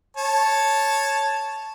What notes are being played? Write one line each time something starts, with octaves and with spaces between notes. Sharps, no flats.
C#5 A5